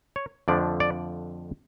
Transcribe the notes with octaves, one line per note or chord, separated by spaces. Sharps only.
C#5
F2 D3 F3 A3 D4 D5
D5